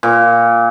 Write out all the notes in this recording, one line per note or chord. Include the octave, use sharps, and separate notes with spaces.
A#2